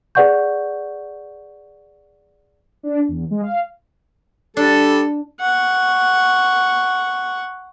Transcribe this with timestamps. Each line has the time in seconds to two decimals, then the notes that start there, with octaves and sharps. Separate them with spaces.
0.15 G#4 B4 D5 F#5 C#6 G6
2.83 D4
3.08 E2
3.31 G#3
3.43 F5
4.57 G3 D4 A4
5.41 F#5 C#6